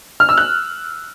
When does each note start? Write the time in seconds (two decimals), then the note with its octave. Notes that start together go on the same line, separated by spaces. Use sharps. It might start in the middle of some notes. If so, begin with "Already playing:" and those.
0.20 F6
0.29 E6
0.38 F#6